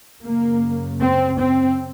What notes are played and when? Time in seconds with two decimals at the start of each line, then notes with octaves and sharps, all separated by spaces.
0.21 F#2 C#3 A#3
1.00 C4
1.38 C4